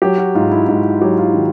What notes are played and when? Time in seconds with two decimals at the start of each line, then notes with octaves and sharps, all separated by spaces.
0.02 F#3 G4
0.18 F#4
0.35 G#2 F4
0.51 E4
0.68 G#2 E4
1.01 F#3 G4
1.18 F4
1.34 D#3